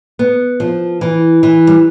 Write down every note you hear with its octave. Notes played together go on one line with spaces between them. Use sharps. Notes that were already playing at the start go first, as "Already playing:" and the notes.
B3
F3
E3
E3
G3